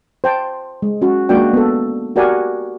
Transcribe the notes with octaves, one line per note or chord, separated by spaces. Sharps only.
C5 G5 A5
G#3
C#4 F#4
G#3 A#3 D4 F#4 D5 G5
B3 A4
F#4 G4 A#4 D5 F#5 G#5